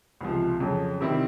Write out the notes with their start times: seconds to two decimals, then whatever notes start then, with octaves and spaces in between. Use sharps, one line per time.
0.21 C#2 C3 F3
0.60 F2 C#3 F#3
1.01 C3 D#3 G3 C4 E4